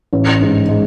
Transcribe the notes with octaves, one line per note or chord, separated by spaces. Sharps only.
A1
G#2
G#3